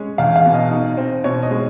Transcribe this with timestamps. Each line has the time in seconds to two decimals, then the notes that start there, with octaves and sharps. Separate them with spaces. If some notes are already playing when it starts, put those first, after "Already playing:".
Already playing: G#3 C#4 C#5
0.18 E2 F5
0.36 F5
0.46 B2
0.54 D#5
0.71 D#4
0.97 C4
1.24 B2 C#5
1.42 D#5
1.51 G#3